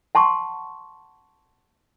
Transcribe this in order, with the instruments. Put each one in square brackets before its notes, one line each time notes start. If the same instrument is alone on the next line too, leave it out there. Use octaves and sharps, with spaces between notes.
[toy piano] F#5 A5 C6 C#6